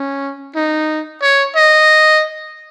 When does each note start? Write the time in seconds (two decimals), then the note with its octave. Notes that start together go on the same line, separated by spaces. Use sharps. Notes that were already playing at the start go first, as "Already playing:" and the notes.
Already playing: C#4
0.56 D#4
1.22 C#5
1.56 D#5